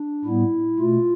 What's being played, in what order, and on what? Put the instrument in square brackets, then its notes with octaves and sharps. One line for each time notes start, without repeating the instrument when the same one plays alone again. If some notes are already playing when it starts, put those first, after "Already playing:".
Already playing: [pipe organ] D4
A2 G3 B3 E4
B2 A3 F4